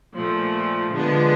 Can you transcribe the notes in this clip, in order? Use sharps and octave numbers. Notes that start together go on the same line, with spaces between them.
A#2 F3 A3
D3 F3 G#3 B3 D4